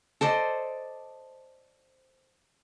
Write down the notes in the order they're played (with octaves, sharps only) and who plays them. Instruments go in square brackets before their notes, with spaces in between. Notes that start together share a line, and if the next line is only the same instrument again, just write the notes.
[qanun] A4 C5 D5 D#5